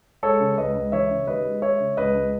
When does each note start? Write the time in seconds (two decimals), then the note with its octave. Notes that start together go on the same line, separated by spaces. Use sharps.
0.23 G#3 A4 C#5
0.40 C#3
0.57 C#2 B4 D#5
0.75 C#2
0.92 E3 C#5 E5
1.10 C#3
1.27 D#2 B4 D#5
1.45 G#3
1.62 G#3 C#5 E5
1.79 C#3
1.97 C#2 B4 D#5
2.15 C#2